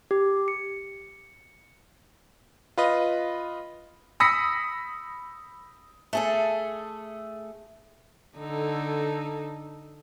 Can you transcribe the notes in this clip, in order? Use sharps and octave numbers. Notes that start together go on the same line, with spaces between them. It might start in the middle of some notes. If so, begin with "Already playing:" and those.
G4
C#7
F4 B4 D#5
B5 D#6 E6 A#6 B6 C#7
A3 G#4 A4
D3 D#4 A4